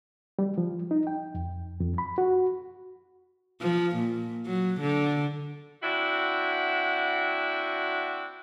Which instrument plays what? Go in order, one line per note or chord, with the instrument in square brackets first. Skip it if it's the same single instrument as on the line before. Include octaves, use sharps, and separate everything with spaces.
[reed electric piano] G3
F3
D#4
G5
F2
F2
B5
F#4
[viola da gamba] F3
A#2
F#3
D3
[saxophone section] C4 D4 E4 F#4